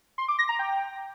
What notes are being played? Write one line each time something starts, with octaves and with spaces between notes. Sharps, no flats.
C6
D6
A#6
A#5
G5